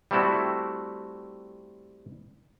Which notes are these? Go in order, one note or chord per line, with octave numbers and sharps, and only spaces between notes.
G3 A3 C4 E4 F#4 A4